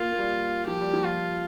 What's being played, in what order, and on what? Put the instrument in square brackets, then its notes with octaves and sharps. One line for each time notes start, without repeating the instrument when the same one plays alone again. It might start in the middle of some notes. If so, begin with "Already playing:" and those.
Already playing: [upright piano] A#3 [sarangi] F4
[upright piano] A#3
G3
[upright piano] F3 [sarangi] G4
[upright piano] G3
F3
[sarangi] F4